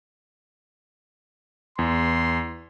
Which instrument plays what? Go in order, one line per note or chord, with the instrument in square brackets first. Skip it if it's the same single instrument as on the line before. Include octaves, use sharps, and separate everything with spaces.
[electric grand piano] E2 [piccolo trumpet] C6